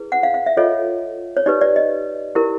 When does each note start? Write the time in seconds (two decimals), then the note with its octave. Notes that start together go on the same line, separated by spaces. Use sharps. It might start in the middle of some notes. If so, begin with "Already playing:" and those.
Already playing: E4 G#4 B4
0.12 F#5
0.23 F5
0.34 F5
0.46 E5
0.57 F4 A4 C#5 D#5
1.37 C#5
1.46 D#4 G4 B4 D5
1.61 D5
1.76 D#5
2.35 E4 G4 A#4